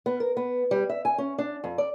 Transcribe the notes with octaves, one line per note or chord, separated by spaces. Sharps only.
B3
A#4
B3
G3
E5
G#5
C#4
D4
F2
D5